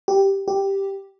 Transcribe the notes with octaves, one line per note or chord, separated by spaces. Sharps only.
G4
G4